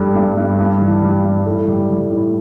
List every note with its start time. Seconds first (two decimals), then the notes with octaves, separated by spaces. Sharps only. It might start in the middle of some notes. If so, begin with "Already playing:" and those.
Already playing: G2 G3 A4
0.15 G2
0.37 G2
0.59 G2
0.81 E3
1.02 G3
1.25 G2
1.46 A2 A4
1.68 G3
1.90 G3
2.11 A2